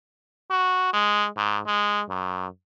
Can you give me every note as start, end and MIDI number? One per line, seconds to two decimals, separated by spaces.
0.51 0.90 66
0.94 1.27 56
1.37 1.60 44
1.67 2.02 56
2.09 2.47 42